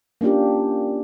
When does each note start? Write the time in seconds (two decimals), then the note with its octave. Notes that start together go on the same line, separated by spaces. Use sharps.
0.21 A#3 C#4 D4 F4 G4